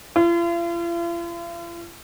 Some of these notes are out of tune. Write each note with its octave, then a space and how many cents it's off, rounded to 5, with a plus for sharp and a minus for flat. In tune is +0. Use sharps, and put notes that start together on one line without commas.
F4 -45